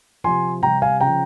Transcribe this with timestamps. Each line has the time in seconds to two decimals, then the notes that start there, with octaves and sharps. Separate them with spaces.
0.24 C3 F3 G#5 C6
0.63 C3 G3 G5 A#5
0.82 F5 G#5
1.01 C#3 F3 G5 A#5